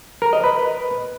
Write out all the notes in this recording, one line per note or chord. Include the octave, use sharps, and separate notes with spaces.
A#4
D#5
B4